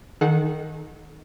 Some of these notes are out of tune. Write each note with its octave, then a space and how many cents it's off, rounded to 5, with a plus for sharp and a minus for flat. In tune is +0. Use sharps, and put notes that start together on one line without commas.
D#3 +0 A4 -40 F#5 -15